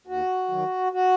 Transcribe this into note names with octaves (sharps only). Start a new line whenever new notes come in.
D#2 F#4
D#3 F#3
F#4